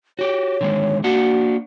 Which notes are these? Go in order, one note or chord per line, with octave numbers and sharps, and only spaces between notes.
F#4 G4 C#5
D3 D#3 G#3
A#3 D4 F#4 F#5